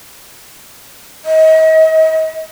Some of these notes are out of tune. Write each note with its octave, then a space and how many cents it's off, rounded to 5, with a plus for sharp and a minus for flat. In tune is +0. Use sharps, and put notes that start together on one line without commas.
D#5 +40